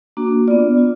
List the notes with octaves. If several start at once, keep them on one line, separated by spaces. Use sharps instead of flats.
A#3 D4 F#4
B3 D4 F4 D5
F4